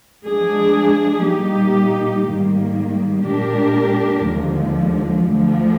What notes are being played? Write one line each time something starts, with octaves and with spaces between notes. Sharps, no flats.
F3 G#3 D4 G#4
A#2 G3 A#3 D#4 G4
G#2 D#3 G3 A#3
A#2 G#3 D4 G4 A#4
D#2 D3 F3 G#3
D2 D3 F3